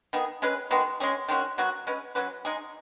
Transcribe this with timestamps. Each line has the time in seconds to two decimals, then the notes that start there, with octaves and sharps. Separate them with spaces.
0.13 D#3 B3 G#4
0.42 G#3 C#4 G#4 B4
0.71 D#3 G#3 B3 F#4
1.00 G#3 C#4 G#4
1.28 D#3 G#3 C#4 F#4
1.58 F#3 B3 F#4
1.87 G#3 C#4 B4
2.15 F#3 C#4 F#4 B4
2.45 G#3 D#4 G#4